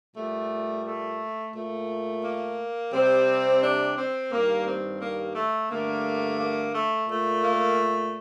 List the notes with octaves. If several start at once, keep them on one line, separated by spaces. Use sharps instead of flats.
A#2 G3 A3
A3
A#2 A3
A#3
C3 G3 C4
D4
C4
G2 D#3 G3 A#3
C4
A#3
A3
G2 D3 A3 A#3
A#3
A3
A#2 A3
A#3